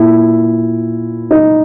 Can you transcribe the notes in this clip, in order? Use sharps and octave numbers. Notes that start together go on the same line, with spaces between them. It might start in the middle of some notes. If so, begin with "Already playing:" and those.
Already playing: A#2 E4
D#4